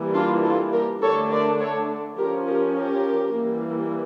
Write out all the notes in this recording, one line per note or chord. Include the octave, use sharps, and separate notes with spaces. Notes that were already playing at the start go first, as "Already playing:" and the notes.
Already playing: E3 G3 A#3
D4 F4
F4 A4
G4 A#4
D3 A3 D4 A4 C#5
A#4 D5
A4 C#5
F3 C#4 G4 A#4
G4 A#4
G4 A#4
E3 G3 A#3